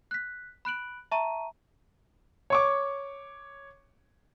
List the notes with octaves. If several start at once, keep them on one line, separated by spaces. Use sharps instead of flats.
F#6 B6
B5 F#6 D7 F#7
E5 A5 A#5 C#6 D#7
C#5 C#6 D6